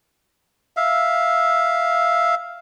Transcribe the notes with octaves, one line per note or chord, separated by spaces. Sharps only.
E5 F5